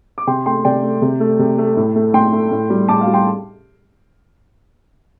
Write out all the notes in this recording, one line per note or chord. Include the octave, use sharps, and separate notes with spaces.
D6
C3 G5 C6
A3 G5 C6
C3 D5 G5
A3
C3
A3
C3
A3
A2
A3
A2 G5 C6
A3
A2
G3
A2 A5 D6
F5
G3
G5 C6